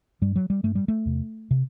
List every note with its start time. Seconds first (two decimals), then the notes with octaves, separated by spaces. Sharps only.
0.22 G2 G3
0.36 F#3
0.50 G3
0.63 G2 A3
0.75 G3
0.88 A3
1.05 E2 C3
1.51 C3